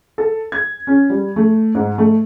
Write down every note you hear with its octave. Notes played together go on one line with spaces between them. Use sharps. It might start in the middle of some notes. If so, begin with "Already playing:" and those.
A4
G#6
C#4
G3
A3
G#2
A3